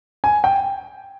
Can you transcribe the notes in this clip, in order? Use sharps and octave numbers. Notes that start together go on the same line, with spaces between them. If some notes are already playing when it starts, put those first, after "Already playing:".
G#5
G5